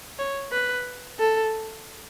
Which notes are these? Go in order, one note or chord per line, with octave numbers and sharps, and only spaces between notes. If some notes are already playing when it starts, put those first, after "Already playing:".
C#5
B4
A4